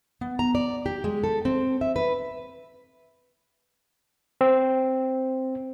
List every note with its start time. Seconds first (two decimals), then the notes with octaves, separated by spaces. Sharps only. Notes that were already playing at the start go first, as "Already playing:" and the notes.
0.21 B3
0.39 A#5
0.55 D5
0.86 G4
1.04 G#3
1.24 A4
1.45 C4
1.81 E5
1.96 B4
4.41 C4